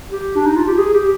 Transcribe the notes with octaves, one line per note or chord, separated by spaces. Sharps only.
G4
D4
D#4
F4
G4
G#4
G4